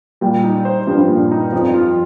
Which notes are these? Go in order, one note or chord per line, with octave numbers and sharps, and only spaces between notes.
A#2 G3
D#4
C5
G2 F3
A#2
D#4
F2 F3
F4